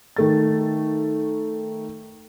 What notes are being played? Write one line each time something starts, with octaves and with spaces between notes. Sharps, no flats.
D#3 A3 A6